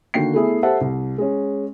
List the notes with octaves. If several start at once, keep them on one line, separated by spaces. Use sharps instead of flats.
D3 D#3 A#3 F#4 G5 C7
A3 B3 E4 G#4 E5
G4 A4 C5 E5 F#5 A5
C2
G#3 C#4